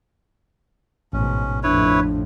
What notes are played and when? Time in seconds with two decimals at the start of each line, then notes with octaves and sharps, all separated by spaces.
1.13 A1 G#2 B2 C#4
1.63 F2 A2 D4 E4 B4 C#5